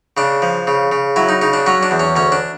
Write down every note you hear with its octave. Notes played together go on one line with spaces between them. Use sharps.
C#3 D4
F3
C#3
C#3
F#3 E4
D#4
C#3 D#4
D4
F#3 C#4
D4
E2
C#4
D2 C#4
D4